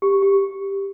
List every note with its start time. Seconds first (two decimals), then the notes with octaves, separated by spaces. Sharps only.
0.02 G4
0.23 G4